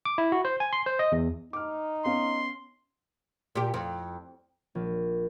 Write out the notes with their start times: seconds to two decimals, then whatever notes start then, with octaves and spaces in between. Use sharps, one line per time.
0.05 D6
0.18 E4
0.32 F#4
0.45 C5
0.60 G#5
0.73 C6
0.86 C5
0.99 D#5
1.12 E2
1.53 D#4 D6 F6
2.05 B3 C#4 F5 C6
3.55 A#2 G4
3.74 F2
4.75 A#1